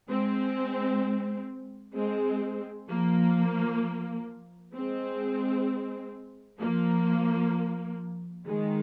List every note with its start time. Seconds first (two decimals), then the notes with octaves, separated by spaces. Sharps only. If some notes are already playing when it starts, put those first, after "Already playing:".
0.09 G#3 C4
1.95 G#3 C4
2.89 F3 A#3
4.75 G#3 C4
6.61 F3 A#3
8.47 D#3 G#3